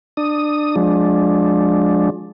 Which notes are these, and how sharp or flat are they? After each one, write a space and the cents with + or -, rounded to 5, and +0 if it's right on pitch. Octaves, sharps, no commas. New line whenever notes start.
D4 +20 D#6 +0
F3 +35 G#3 +10 D4 +0